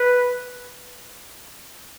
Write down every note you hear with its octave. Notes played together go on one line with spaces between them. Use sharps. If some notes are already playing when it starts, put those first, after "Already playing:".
Already playing: B4